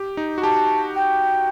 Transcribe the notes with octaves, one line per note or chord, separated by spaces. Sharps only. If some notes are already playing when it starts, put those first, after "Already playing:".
Already playing: G4
D#4
F#4
G4 A5
G5